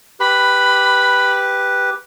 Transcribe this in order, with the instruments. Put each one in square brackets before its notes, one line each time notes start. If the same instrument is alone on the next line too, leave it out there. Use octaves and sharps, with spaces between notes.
[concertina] G4 B4 [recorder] B5